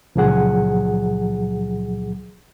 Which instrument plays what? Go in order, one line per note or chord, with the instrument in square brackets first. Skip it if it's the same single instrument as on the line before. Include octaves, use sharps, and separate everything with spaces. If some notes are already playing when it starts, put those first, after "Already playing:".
[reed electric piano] C#2 A#2 F3 F#3 G#4 F#5